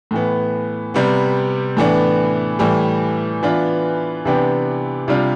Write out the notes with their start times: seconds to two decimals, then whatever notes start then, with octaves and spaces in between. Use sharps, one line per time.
0.11 A2 E3 B3
0.94 C3 G3 B3
1.77 A2 E3 B3 D4
2.59 A2 E3 G3
3.43 E3 B3 D4 F4
4.25 C3 E3 B3 D4 G4
5.08 C3 G3 D4 F4